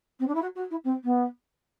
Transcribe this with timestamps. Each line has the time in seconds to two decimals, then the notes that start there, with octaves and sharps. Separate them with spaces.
0.20 C4
0.28 D4
0.35 E4
0.42 F#4
0.55 F#4
0.71 E4
0.84 C4
1.04 B3